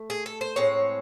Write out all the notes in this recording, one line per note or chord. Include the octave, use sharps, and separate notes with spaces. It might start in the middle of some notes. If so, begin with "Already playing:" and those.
Already playing: A3
G#4
A4
C5
A2 G#3 C4 C#5